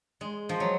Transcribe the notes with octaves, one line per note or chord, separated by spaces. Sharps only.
G#3
F3
F#3